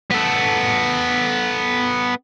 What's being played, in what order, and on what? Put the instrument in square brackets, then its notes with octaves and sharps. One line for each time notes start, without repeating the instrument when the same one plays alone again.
[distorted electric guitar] B3 A4